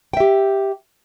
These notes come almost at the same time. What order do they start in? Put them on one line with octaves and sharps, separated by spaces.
G5 E5 G4